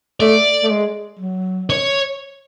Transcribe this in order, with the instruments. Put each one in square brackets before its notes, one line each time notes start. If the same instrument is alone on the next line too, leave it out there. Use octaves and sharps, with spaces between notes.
[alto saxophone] A3 [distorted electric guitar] D5
[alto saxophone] A3
G#3
F#3
[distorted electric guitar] C#5